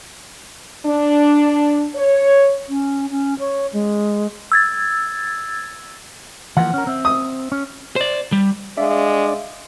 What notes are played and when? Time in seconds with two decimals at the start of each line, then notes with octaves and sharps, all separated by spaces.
0.86 D4
1.96 C#5
2.69 C#4
3.11 C#4
3.39 C#5
3.73 G#3
4.52 E6 G#6 A6
6.57 E3 F3 A#3 F#5
6.74 C#4 A#4
6.87 C4 E5
7.05 D#6
7.52 C#4
7.96 C5 D5
8.32 G3
8.77 G#3 D4 D5 E5 F5